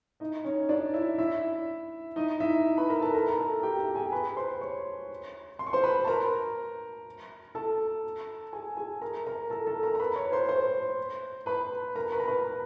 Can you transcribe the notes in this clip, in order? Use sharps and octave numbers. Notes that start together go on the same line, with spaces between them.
D#4 D#5
C#4 C#5
D4 D5
E4 E5
E4 E5
D#4 D#5
E4 E5
B4 B5
A#4 A#5
A4 A5
A#4 A#5
A#5
A4 A5
G4 G5
G4 G5
G#4 G#5
B4 B5
C5 C6
C#5 C#6
C6
C#6
C5 C6
B4 B5
A5
A#4 A#5
A4 A5
G#4 G#5
G#4 G#5
A#4 A#5
A#4 A#5
A4 A5
A4 A5
A#4 A#5
A#5
B4 B5
C#5 C#6
C5 C6
C5 C6
B4 B5
A#4 A#5
B4 B5
A#5
B4 B5